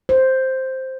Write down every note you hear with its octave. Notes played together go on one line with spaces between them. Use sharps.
C5